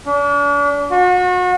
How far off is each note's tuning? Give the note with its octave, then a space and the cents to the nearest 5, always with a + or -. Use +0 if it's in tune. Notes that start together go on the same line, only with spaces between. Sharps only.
D4 -40
F#4 -35